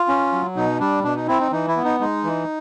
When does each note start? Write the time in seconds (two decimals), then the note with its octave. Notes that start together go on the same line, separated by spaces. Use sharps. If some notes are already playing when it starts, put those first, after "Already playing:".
Already playing: F4
0.08 C#4
0.32 F#3
0.56 B2 D#4
0.80 G3 D4
1.04 B2 D4
1.16 D#4
1.28 C4 E4
1.40 D#4
1.52 E3 D#4
1.68 E4
1.77 B3
1.85 D#4
2.00 G#3 D#4
2.24 E3